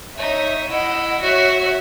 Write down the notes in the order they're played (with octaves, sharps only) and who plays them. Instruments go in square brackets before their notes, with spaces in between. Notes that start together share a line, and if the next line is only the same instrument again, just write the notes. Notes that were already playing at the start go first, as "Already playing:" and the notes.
[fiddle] D#4 [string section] C#5 E5
[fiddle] E4 [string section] D#5 F#5
[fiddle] F#4 [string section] C#5 E5